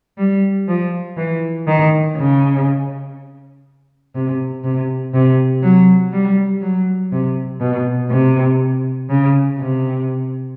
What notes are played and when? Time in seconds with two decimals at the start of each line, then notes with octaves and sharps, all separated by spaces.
0.18 G3
0.68 F3
1.17 E3
1.67 D#3
2.16 C#3
4.15 C3
4.64 C3
5.14 C3
5.62 F#3
6.13 G3
6.61 F#3
7.12 C3
7.60 B2
8.10 C3
9.09 C#3
9.59 C3